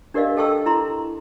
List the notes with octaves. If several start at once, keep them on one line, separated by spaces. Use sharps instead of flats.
D4 G4 A#4 D5 D#5 F5
A4 D#5 G5 A5 C#6 E6
E4 A#5 C6